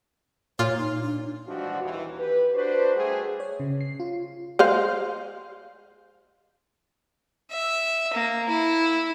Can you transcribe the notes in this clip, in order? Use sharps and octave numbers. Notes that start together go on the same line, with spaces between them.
A#2 F4 C#5
D#4
D4
E3 F3 G3 G#3 D4 F#4
D#2 E3
G4 B4
D4 F#4 B4 C5
G3 A3 F#4 G#4
C#5
C#3
C7
F4
G#3 C5 F5
E5
A#3
E4